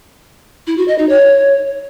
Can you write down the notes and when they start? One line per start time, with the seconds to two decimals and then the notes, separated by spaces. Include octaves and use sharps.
0.67 E4
0.77 F#4
0.88 D#5
0.99 D#4
1.09 C#5